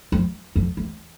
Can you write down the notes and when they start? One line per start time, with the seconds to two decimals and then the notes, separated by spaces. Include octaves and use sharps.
0.12 F2
0.56 F2
0.77 E2